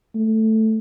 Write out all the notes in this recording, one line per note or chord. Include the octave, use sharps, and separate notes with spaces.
A3